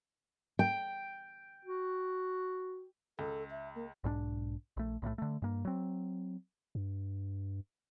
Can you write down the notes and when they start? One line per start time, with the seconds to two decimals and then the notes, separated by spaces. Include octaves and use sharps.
0.59 G5
1.65 F#4
3.19 C#2 A4
3.51 E5
3.75 A#3
4.04 B1 G#2 C#4 D4
4.77 A#1 A3
5.02 B1 A2 C#3 A3
5.18 D3 A3
5.42 G2 A#3
5.65 F#3 C4
6.75 G2